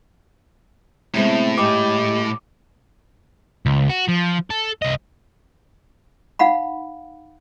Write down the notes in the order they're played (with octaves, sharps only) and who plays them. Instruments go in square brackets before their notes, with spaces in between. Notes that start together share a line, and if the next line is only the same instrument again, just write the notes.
[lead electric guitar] A2 [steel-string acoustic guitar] C3 G#3 C5 [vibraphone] B3 C4 E5
[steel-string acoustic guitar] G#2 G#3 G5 [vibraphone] G4 D#5 B5 [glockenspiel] D6
[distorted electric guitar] C#2
F#4
F3
A4
C2 D#5
[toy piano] D#4 F5 F#5 B5